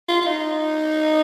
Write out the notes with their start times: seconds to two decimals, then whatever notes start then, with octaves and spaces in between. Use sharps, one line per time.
0.08 F4
0.22 F4
0.26 D#4